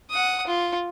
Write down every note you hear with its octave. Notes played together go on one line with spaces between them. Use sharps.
F#5 D#6
F4